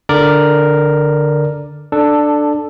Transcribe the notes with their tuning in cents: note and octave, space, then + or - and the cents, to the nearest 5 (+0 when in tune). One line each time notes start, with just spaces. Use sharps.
D3 +0 A#4 +0 D5 +0
D4 +10 A4 +0